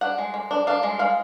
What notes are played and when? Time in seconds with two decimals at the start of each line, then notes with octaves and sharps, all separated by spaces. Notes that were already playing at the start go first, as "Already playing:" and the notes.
0.01 D4 F#5
0.18 G#3
0.34 G#3
0.51 D4
0.67 D4 F5
0.83 G#3
0.99 G#3 F5